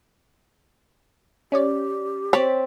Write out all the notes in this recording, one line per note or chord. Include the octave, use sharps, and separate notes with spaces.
C#4 G4 C#5 D5
C4 C#5 D5 B6